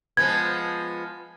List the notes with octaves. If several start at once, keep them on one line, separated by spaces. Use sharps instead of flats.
F3 G#3 B3 G#6